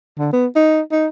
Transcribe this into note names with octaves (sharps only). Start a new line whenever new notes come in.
D3
B3
D#4
D#4